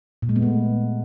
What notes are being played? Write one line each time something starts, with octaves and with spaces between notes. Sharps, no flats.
A#2
G#3
B3
A3